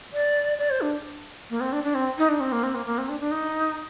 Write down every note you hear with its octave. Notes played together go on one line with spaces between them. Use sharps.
D5
D5
C5
D4
A#3
C4
D4
D4
C4
D#4
D4
C4
A#3
C4
A#3
A#3
C4
D4
D4
D#4